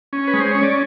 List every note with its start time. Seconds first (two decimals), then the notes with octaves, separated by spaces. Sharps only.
0.13 C#4
0.27 B4
0.34 G#3
0.40 C5
0.51 C#4 C#5
0.63 D5